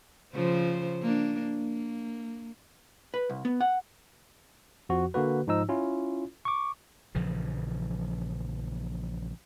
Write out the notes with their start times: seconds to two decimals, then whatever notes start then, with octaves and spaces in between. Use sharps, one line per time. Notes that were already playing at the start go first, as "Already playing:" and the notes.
0.34 C#3 F3 C5
1.02 A#3 D4
1.58 A#3
3.14 B4
3.30 C2
3.45 B3
3.61 F#5
4.89 F2 F3 F#4
5.14 D3 A#3 F#4 B4
5.47 G#2 F3 D#4 E6
5.69 C#4 E4 F4
6.45 C#6 D6
7.15 A#1 C#3 E3 F3